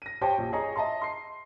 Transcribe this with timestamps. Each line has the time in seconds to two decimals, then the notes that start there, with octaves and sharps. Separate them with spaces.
0.02 A#6 D#7
0.21 G4 C5 C#5 G5 A5
0.38 A#1
0.53 G#4 C#5 D#5 A#5
0.76 D#5 E5 A5 A#5 C6
1.02 C6 C7